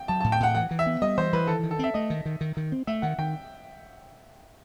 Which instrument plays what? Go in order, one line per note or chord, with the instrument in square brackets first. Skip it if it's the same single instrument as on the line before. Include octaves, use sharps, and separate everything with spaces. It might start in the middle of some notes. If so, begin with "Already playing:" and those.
Already playing: [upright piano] G5
[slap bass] F#3 [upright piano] A5
[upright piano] A5
[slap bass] A2
[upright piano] G5
[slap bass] A2 [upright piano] F#5
[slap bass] E3 [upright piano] F#5
[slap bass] E3
[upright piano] E5
[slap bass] B3
[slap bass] G3 [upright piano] D#5
[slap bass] E3 [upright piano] C5
[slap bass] E3 [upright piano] B4
[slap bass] D#3 [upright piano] A4
[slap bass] D#3
[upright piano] A4
[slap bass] C4 [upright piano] E5
[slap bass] A3 [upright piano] D#5
[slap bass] D#3
D#3
D#3
D#3
C4
[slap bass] A3 [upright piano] E5
[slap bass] D#3 [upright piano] F#5
[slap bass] D#3 [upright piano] G5